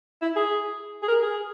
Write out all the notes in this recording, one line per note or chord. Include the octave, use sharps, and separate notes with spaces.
E4
G#4
G#4
A#4
G#4